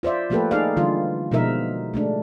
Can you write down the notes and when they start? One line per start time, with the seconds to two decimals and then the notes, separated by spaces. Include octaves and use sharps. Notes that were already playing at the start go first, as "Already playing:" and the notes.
0.03 F4 C5 D5 E5
0.30 F3 A3 A#3 G4 A4 B4
0.51 D#4 G#4 A4 D5 F5
0.77 D3 E3 G3 F4
1.31 B2 F3 G#3 D#4 A#4 E5
1.94 G#3 A3 D4